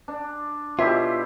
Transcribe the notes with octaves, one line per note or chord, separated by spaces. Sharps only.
D4
B2 E4 F4 G4 C#5 E5